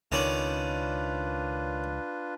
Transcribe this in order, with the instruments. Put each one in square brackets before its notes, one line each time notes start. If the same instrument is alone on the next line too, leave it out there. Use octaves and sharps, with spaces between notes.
[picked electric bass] C#2 [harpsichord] D#3 C#4 D5 [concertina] D4 F4 B4